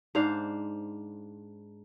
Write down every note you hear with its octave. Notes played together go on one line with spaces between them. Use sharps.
G#2 D4 C5 F5